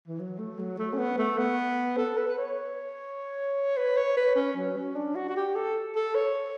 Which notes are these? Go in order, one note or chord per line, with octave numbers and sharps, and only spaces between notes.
E3
F#3
A3
F#3
A3
C#4
B3
A3
B3
A4
B4
B4
C#5
B4
C#5
B4
C#4
F#3
C#4
D4
F#4
F#4
G4
A4
A4
C#5